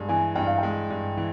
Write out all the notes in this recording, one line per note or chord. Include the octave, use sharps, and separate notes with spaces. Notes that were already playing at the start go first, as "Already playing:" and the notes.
Already playing: G2 G#3
E3 G#5
G2 G5
F5
G#3 G5
G2
E3